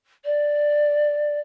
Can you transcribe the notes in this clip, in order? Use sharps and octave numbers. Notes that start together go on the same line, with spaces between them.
D5